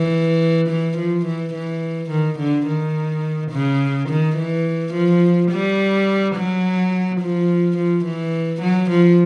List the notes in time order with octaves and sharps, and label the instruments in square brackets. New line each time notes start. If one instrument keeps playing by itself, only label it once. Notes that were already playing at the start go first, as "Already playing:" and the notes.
Already playing: [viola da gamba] E3
E3
F3
E3
E3
D#3
D3
D#3
C#3
D#3
E3
F3
G3
F#3
F3
F3
E3
F#3
F3